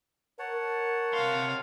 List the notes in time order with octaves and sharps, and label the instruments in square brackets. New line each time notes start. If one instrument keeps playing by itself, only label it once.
[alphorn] A#4 [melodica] C#5 F#5 A5
[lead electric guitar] C3 C6 [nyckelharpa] F5